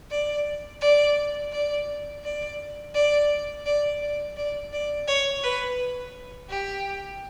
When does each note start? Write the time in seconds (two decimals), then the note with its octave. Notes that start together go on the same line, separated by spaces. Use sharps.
0.11 D5
0.81 D5
1.52 D5
2.24 D5
2.94 D5
3.66 D5
4.01 D5
4.37 D5
4.73 D5
5.08 C#5
5.43 B4
6.50 G4